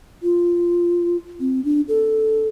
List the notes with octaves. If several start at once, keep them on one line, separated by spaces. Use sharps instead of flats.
F4
C4
D4
A4